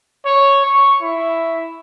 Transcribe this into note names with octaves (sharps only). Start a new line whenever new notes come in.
C#5
C#6
E4